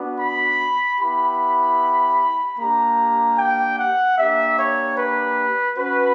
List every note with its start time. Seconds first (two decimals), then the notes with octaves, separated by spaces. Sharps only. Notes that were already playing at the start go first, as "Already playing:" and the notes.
Already playing: B3 D4 F#4
0.20 B5
1.00 B3 E4 G4 B5
2.59 A#3 D4 G4 A#5
3.38 G5
3.79 F#5
4.18 A#3 D4 G4 E5
4.58 C#5
4.98 B4
5.77 C#4 F#4 B4